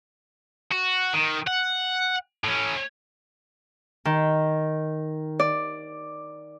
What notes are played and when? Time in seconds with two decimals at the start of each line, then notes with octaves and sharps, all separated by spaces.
0.72 F#4
1.13 D#3
1.47 F#5
2.44 A2 C#4
4.05 D#3
5.39 D5